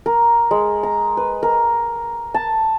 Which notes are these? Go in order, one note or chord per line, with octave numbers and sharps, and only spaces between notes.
A#4
G#3
A#5
B4
A#4
A5